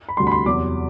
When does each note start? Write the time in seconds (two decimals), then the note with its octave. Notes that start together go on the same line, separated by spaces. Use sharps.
0.09 B5
0.17 D2 C3 G3 C6
0.27 B5
0.32 C6
0.46 E2 C3 F#3 D6